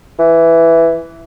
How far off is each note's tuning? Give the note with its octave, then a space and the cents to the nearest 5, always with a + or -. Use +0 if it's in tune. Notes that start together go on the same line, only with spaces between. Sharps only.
E3 +5